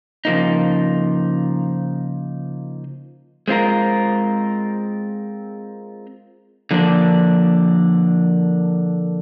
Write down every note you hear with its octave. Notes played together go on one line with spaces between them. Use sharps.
C#3 F3 A#3 D#4
G#3 C4 F4 A#4
D3 F3 A#3 D4